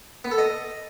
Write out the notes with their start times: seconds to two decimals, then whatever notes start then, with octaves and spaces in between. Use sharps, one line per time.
0.25 B3
0.31 A4
0.38 D#5